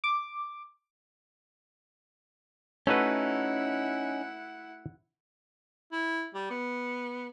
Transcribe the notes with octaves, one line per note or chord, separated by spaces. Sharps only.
D6
A3 C#4 D#4 E4 F#4 B4 F#5
E4
G3
B3